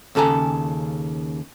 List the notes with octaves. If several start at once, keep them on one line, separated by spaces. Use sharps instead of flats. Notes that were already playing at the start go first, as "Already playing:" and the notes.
D#2 C#3 A4 G#5 A#5